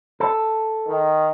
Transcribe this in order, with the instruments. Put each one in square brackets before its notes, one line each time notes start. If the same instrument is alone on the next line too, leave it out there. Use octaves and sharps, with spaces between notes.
[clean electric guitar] A4
[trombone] D#3